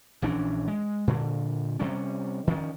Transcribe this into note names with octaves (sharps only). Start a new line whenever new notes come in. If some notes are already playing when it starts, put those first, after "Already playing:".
A#1 E3 C#4 D4
G#3
A#2 D3
C3 G3 C#4
D#3 F3 C#4